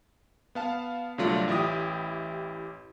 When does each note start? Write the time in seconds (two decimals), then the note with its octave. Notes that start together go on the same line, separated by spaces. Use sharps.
0.55 B3 F5 A5
1.18 C2 D3 F#3 A3 F4 D5
1.48 A1 E4 G4 D#6